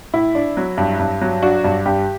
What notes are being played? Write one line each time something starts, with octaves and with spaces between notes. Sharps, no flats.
A2 E4
D4
F#3
G2
G2
F#3
D4 F#4
G2
G2 G4